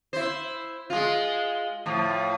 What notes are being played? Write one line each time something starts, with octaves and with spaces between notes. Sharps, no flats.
E4 C5
G#3 F4
A2 F3